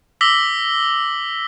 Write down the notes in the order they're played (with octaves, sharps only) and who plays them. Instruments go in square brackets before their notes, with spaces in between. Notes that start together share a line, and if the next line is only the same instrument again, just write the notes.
[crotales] D6 E6 A#6 B6 F#7 G7